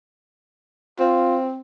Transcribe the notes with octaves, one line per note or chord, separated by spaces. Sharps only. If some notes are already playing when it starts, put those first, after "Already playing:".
C4 F4